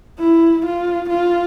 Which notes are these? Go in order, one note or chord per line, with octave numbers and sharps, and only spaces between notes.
E4
F4
F4